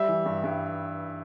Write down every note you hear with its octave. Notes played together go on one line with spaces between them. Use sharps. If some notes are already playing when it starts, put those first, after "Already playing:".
Already playing: G3 E5
E3
G2
G2